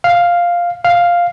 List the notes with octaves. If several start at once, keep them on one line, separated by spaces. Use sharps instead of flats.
F5
F5